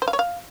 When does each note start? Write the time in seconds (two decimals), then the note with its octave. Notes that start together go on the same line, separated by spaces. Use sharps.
0.02 C5
0.08 F5
0.13 C#5
0.19 F5